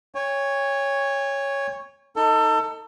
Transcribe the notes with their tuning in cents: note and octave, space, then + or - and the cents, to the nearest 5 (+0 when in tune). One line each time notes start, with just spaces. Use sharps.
C#5 +0 G#5 -45
D#4 +15 A4 +30